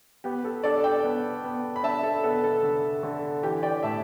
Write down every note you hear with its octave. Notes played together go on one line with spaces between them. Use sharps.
B3 G4
A4
D4 A4 D5
A5
D5 G5
B3
B3
B5
D4 E5 A5
A4
B3 A4
A4
D3
D3
E3 G4
D5 G5
A2 E5 A5